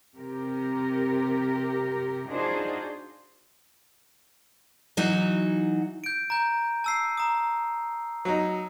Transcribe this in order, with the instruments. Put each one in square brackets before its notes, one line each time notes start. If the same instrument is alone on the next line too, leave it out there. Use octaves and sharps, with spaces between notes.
[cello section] C3 G4 A#4
D4 D#4 F4 F#4 G#4 C5
[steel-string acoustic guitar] E3 F#3 D#4 F#4
[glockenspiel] G6 D7
A#5 G6
A5 E6 C7
A#5 D#6
[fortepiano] F#3 D#4